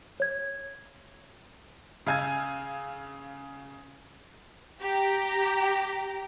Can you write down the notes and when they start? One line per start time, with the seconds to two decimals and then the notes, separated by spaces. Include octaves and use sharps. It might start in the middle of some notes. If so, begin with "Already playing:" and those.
0.20 C#5 G#6
2.07 C#3 F5 G#5 E6 G#6
4.82 G4 A#5